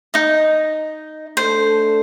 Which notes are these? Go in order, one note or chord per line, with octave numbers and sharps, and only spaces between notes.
D#4 D#5
A3 D4 A4 C5